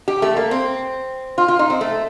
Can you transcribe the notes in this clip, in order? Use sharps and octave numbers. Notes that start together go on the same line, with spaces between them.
G4
A3
A#3
C4
F4
F4
D#4
C4
A3